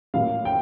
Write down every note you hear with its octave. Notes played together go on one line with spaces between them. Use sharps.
A2 F#3 A#3 F5
G5